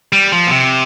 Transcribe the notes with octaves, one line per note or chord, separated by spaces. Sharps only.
G3
F3
A#2
C3